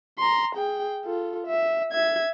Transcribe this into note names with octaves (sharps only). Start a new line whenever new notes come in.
A#5 C6
G#4 G5
F4 A4
E5
E5 G#6